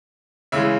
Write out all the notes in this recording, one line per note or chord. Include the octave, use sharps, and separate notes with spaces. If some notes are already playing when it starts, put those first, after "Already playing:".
C#3 E3 G#3 E5